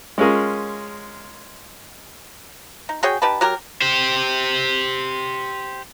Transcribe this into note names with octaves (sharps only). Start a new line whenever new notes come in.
G#3 C#4 F4 G#4 A#4
D#4
F#4 G#4 C#5 G5
D#4 G4 B4 A5
F#3 G4 A#4
G4 C5